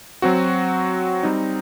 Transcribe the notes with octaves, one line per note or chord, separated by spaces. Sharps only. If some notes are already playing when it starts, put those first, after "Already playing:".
F#3 C4 F#4
G3 C4 D#4